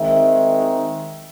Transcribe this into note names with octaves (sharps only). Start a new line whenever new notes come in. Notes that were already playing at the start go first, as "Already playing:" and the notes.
Already playing: D#3 G#3 C4 D#4 E5